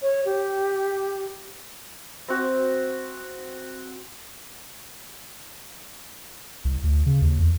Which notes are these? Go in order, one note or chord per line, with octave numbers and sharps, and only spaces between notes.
C#5
G4
C4 F#4
C2
D2
C#3
D#2
E2